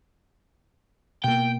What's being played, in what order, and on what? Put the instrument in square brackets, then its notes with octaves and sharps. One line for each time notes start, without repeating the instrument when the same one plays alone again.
[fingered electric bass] B2 A#3 [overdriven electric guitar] G5